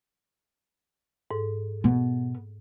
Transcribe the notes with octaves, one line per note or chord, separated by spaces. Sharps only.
G#2 A4
B2 B3